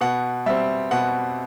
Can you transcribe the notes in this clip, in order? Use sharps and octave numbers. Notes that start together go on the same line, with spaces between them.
B2 F#5
G3 C4 E5
B2 F#5